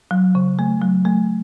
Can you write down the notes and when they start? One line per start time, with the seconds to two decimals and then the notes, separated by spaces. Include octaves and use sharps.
0.11 F#3
0.35 C#3
0.59 A3
0.82 F#3
1.05 A3